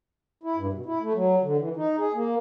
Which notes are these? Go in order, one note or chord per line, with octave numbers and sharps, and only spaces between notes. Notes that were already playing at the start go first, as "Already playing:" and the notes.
E4
G2
B2
E4
A3
F#3
D3
E3
D#4
G#4
A#3